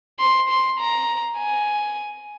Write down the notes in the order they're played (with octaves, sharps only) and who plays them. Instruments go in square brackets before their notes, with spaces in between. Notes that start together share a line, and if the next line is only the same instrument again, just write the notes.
[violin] C6
C6
A#5
G#5